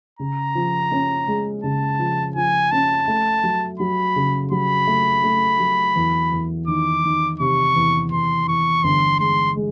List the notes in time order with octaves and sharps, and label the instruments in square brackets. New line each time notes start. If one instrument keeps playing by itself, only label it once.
[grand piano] C#3 [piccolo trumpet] A#5
[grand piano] F3
C#4
G#3
[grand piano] C#3 [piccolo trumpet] A5
[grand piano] F3
[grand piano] F3 [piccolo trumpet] G#5
[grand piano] C#4 [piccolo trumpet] A5
[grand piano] A3
F#3
[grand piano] F#3 [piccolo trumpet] B5
[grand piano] C#3
[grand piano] F#3 [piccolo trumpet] B5
[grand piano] A3
A3
F#3
E2
E2
[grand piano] D#3 [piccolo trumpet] D6
[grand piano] D#3
[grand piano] C3 [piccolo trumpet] C#6
[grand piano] E2
[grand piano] E2 [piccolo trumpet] C6
[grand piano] E2 [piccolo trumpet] C#6
[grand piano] G1 [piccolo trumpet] C6
[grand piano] G#3 [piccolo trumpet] C6
[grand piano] G#3